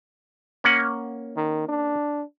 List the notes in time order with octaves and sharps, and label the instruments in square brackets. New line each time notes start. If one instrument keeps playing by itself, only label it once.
[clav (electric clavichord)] A#3 C#4 F#5
[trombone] D#3
D4